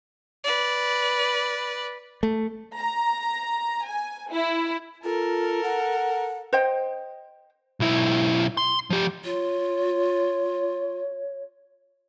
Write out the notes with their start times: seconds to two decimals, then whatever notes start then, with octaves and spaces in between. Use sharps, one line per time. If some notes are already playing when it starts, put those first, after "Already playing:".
0.44 B4 D5
2.23 A3
2.77 A#5
3.85 G#5
4.32 E4
5.04 F4 A4 A#4
5.63 F#5
6.53 C5 D#5 G5
7.80 B1 E4
8.57 C6
8.90 F3 G4
9.24 F4 C#5